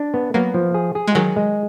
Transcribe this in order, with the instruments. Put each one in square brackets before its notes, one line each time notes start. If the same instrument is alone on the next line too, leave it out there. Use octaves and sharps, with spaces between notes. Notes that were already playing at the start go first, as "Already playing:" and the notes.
Already playing: [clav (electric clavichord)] D4
B3
[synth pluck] F#3 A#3 [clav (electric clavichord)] B3
[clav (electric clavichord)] F3
G#4
G#4
[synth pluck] G#3
[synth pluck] D#3 F#3 [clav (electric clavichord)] G#4
[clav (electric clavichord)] G#3